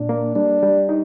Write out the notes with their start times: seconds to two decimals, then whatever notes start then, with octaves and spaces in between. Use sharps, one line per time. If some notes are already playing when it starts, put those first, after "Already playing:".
Already playing: A#2 D4
0.09 A#3
0.35 G3 D4
0.63 G3
0.89 D#4